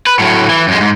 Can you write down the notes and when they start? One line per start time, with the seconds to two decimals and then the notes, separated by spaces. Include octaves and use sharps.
0.07 B4
0.19 A2 F#3
0.49 E3
0.68 F#2 G#3
0.80 G#2